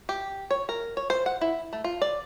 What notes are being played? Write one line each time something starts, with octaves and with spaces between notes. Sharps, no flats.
G4
C#5
A#4
C#5
C5
F#5
E4
A3
F4
D5